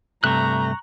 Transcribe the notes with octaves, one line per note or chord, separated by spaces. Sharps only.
G2 C3 A3 A#5 C#6 F#6